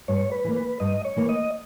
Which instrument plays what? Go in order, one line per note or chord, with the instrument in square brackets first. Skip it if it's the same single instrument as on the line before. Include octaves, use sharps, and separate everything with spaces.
[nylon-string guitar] G2 [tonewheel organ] C#5
[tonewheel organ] B4
[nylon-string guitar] E3 A#3
[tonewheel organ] B4
[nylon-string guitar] G2 [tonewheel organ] D#5
[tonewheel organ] C#5
[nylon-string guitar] E3 A#3
[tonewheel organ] D#5